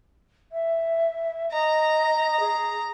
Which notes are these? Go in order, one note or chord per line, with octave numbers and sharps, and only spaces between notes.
E5
D#5 A#5
G#4